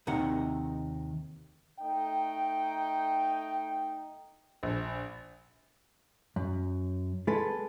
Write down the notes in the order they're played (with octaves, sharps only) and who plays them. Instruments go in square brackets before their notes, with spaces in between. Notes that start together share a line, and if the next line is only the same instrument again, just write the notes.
[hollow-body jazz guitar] D#2 C3 D#3 D#4 F#5
[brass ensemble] A3 D#4 G5
[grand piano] A#1
[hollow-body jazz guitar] F#2
G#3 A4 B4